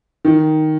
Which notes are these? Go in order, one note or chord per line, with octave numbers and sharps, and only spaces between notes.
D#3